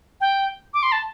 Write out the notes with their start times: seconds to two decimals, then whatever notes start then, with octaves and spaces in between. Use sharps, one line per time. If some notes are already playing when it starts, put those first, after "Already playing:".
0.21 G5
0.74 D6
0.83 C6
0.92 A5